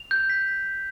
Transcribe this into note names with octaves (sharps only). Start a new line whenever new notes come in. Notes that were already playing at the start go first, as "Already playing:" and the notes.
Already playing: F7
G6
B6